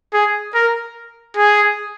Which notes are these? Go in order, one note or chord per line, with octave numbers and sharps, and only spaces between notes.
G#4
A#4
G#4